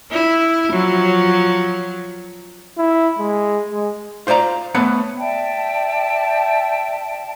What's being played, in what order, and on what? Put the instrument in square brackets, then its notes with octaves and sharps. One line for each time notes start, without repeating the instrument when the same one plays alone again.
[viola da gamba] E4
F3 F#3
[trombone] E4
G#3
G#3
[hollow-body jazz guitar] F4 C5 D5 F5 A#5
A3 B3 B4 C#5 F#5
[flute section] D5 E5 G5 A5